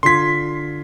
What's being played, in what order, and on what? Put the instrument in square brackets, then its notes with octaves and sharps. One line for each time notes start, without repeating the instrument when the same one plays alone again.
[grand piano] D3 F4 G#6 [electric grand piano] C6 B6